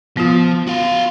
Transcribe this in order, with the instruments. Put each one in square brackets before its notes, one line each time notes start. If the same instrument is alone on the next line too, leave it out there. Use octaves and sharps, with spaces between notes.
[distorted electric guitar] F3 [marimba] B3 F4
[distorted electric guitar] F#4 F5